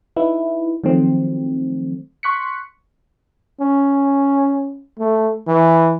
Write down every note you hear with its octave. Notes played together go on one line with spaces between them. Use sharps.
D#4 E4 B4
D#3 F3 F#3 A3 C4
C6 C#6 F#6 B6 C#7
C#4
A3
E3